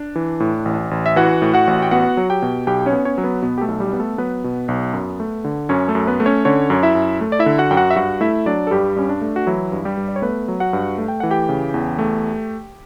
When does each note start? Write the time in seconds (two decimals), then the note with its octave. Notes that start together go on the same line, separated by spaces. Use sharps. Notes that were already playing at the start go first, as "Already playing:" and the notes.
Already playing: D4
0.16 E3
0.40 A2
0.65 A1
0.91 A1
1.06 E5
1.16 E3 F#4 F#5
1.42 A2
1.54 F#4 F#5
1.67 A1
1.82 G5
1.91 B3 F#4 F#5
2.17 F#3
2.30 G4 G5
2.42 B2
2.67 B1 G4 G5
2.86 C#4 C#5
2.92 B3
3.05 C#4 C#5
3.18 F#3
3.24 B3 B4
3.42 B2 B3 B4
3.58 G4
3.61 A3 A4
3.68 B1
3.80 G3 G4
3.93 B3
3.99 A3 A4
4.18 F#3 B3 B4
4.44 B2
4.68 B1
4.93 F#2
5.20 A3
5.44 D3
5.69 F#2 C#4 C#5
5.88 A3 A4
5.95 F#2
6.07 B3 B4
6.20 A3
6.26 C#4 C#5
6.45 D3 C#4 C#5
6.70 F#2
6.83 E4 E5
6.95 F#2
7.21 A3
7.32 D5
7.39 E4 E5
7.46 D3
7.58 F#4 F#5
7.71 F#2 G5
7.77 F#4 F#5
7.90 E5
7.96 G2 F#4 F#5
8.21 A3 E4 E5
8.46 F#3 D4 D5
8.67 A4
8.71 G2 G3 G4
8.96 G2 C#4
9.09 D4
9.21 A3
9.36 F#4
9.47 E3 F#3 E4
9.72 G2
9.85 G3 G4
9.97 G2
10.08 D5
10.16 C#5
10.22 A3 B3 B4
10.48 F#3
10.60 F#4 F#5
10.73 G2
10.98 A3
11.08 G5
11.20 E3 F#5
11.31 G4 G5
11.49 C#3
11.74 E2
11.99 A3